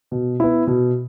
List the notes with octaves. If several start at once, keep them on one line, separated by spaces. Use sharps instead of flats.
B2
B3 E4
B2